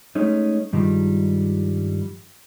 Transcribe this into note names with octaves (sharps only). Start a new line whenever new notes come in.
G#3 A3 C#4 D#4
G2 D#3 F3 G3 G#3